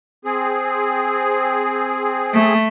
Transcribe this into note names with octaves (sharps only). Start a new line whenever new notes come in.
C4 G#4
A3